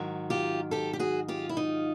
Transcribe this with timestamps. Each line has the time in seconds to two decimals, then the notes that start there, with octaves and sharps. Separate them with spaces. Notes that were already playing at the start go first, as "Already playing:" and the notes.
Already playing: G#2 D#3 F#3
0.30 F4 G4
0.71 G4 A4
0.93 G4
0.99 F#4 G#4
1.28 F4 G4
1.49 E4
1.57 D#4 F4